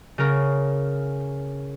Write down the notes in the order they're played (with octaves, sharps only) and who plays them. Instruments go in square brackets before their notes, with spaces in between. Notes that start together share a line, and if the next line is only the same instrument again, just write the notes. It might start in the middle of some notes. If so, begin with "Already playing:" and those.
[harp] C#3 A#4